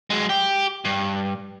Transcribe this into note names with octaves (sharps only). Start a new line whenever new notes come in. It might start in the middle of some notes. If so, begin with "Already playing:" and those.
F#3 G#3
G4
G2